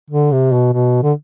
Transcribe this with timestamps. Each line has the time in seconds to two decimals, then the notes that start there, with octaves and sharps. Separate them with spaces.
0.10 D3
0.32 C3
0.52 B2
0.72 B2
1.03 D3